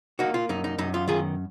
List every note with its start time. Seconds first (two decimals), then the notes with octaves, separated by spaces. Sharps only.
0.19 A#3 D#4 F#4
0.34 F4
0.49 F#2 D#4
0.64 D#4
0.78 F#2 D#4
0.94 F4
1.08 D#3 F4 G#4